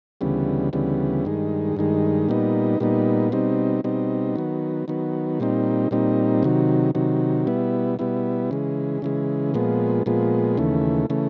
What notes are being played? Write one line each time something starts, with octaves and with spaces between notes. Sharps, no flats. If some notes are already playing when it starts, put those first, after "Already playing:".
D2 C#3 E3 G3 B3
D2 C#3 E3 G3 B3
G2 D#3 G#3
G2 D#3 G#3
A#2 G3 B3 D#4
A#2 G3 B3 D#4
B2 G3 C4 D#4
B2 G3 C4 D#4
D#3 F#3 B3
D#3 F#3 B3
A#2 G3 C4 D#4
A#2 G3 C4 D#4
C3 D#3 F#3
C3 D#3 F#3
B2 G3 B3 E4
B2 G3 B3 E4
C#3 E3 G#3
C#3 E3 G#3
A#2 F3 G#3 B3
A#2 F3 G#3 B3
D#2 C#3 E3 A3
C#3 E3 A3